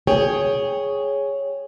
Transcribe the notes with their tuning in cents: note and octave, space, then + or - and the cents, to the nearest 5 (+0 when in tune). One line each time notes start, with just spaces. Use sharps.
G#4 +0 C#5 +0 G5 +15